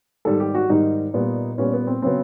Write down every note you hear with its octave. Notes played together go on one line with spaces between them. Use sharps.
G#2 D#3 G3 A4
G4
F#4
G#2 D#3 G3 D#4
A#2 G3 B3
A#2 G3 B3 C#4
B3
C4
C#3 F#3 B3 C4